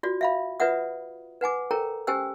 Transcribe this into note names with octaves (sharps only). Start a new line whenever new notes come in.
F4 F#4 D5
E5 F5 B5
F4 B4 D5 E5 F#5 D#6
B4 F#5 G#5 D6
A4 A#4 C#5 G5 A#5
C#4 G4 C5 G5 G#5 E6